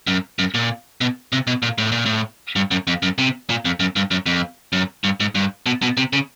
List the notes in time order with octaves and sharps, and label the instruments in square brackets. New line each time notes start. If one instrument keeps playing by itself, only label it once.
[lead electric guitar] F#2
F#2
A#2
B2
C3
B2
A#2
A2
A#2
A2
G2
F#2
F2
F#2
C3
A#2
F2
F#2
G2
F#2
F2
F#2
G2
G#2
G2
B2
B2
C3
C#3